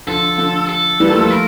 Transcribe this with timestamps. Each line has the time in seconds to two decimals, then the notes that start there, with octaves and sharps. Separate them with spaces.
0.07 D3 F3 A4
0.38 D3 F3
0.69 A4
1.00 E3 G3
1.06 A#3
1.10 F3 A3
1.20 F3 A3
1.31 A#4